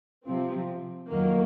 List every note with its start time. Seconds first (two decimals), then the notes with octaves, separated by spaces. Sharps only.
0.24 C3 F3 C4
1.09 F2 D#3 F#3 A#3